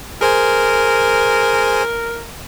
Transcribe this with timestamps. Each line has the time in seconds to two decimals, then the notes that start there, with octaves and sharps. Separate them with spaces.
0.21 G#4 A#4 C5 G#5